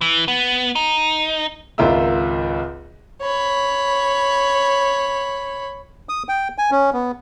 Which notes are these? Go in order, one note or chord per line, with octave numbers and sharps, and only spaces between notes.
E3
B3
D#4
G#1 C#2 F4 A#4 E5 E6
C#5 B5
D#6
G5
G#5
C#4
B3